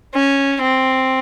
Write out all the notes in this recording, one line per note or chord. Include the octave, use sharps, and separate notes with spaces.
C#4
C4